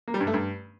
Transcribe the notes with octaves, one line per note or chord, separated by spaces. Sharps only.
A#3
G3
G2
A3
G2